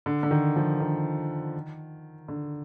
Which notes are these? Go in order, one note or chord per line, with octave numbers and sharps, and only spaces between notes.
D3
D3
D#3
F3
D#3
D3